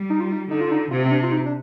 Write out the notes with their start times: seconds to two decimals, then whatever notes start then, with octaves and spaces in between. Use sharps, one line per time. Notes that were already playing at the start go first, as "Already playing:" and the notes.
Already playing: G3
0.10 D#4
0.20 F4
0.32 D#4
0.51 D3 D#4
0.61 F4
0.72 D#4
0.91 C3 F4
1.05 C4
1.11 D4
1.23 F4
1.32 D#4
1.46 D4